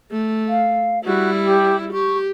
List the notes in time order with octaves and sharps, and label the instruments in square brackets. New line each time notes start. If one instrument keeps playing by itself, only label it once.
[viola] A3
[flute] F5
[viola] G3 E4 [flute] F#4
[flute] G4
[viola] G4 [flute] C#6